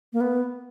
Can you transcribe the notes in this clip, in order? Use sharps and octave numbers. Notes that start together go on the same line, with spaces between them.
A#3
B3